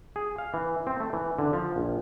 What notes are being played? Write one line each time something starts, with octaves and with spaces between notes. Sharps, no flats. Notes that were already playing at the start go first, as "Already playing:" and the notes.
G#4
F5
E3
C4
A3
E3
D3
F3
A#1